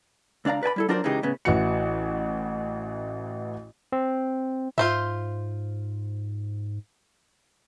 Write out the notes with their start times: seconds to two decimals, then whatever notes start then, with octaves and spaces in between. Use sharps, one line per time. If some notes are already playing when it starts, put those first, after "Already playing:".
0.45 C#2 D4 D5 F5 A#5
0.63 B4 D5 G#5 B5
0.76 G3 E4 A4
0.89 F#3 D4 F4 A#4 C5 D5
1.04 C#3 E3 G#3 D#4 G4
1.23 A2 C#3 B3
1.45 A1 E3 F#4 C#7
3.92 C4
4.78 G#2 F4 C5 E5